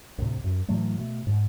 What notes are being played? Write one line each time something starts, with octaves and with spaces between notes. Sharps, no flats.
D2 A2 C3
F#2
A2 E3 F#3 A3
B2 A3
G#2